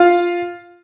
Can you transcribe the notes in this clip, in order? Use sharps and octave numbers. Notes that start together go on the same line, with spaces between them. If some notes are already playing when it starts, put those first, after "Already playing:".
Already playing: F4 F5